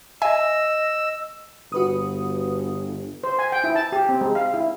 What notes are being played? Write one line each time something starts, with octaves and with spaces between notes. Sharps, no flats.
D#5 E5 G#5 E6
G1 F#4 B4 D#6
C5
G#5
G5
E4
A5
G4
C4
G#3
F5
E4